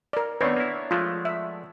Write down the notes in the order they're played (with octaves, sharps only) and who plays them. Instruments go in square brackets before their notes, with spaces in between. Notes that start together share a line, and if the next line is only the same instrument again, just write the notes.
[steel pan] A#4 D5
[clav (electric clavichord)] D#3 A3 C4 [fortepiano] B3 D4 C#5 [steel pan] B4
[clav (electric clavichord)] A#3 E4
[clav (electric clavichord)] F3 G#3 A3 [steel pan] F4
[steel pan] E5